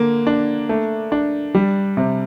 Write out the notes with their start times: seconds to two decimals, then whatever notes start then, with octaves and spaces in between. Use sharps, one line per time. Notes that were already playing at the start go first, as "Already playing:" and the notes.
Already playing: D3 A#3
0.27 D4
0.69 A3
1.12 D4
1.54 G3
1.97 C3